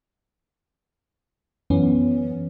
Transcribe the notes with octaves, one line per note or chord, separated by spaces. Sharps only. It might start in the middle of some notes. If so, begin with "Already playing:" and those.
F#2 E3 B3 C#4